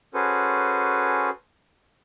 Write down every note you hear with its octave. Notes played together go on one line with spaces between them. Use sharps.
C#4 F#4 G#4 A4 B4 C5